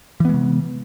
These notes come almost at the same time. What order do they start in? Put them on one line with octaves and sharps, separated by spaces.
E3 B3 G#3 C3